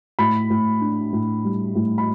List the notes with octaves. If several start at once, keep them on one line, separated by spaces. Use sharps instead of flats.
A2 B5
A2
D4
A2
G3
A2
B5